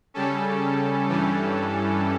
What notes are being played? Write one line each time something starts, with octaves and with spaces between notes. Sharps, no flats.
C#3 G3 C#4 A4
G2 E3 G3 C#4